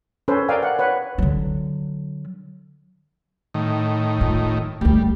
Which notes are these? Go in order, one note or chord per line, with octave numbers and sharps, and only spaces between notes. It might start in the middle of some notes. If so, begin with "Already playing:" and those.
C#4 A4 B4 C5
A#4 D5 F5 G5 G#5
F#5
B4 C#5 F#5
D3 F#3
A2 D#3
F4
F#1 D2 G3